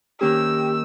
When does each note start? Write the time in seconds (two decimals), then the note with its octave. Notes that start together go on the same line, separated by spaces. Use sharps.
0.21 D#3 A#3 C#4 G4 E6